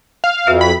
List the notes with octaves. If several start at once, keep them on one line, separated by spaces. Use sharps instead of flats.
F5
F2 F#4 B4 E5
B5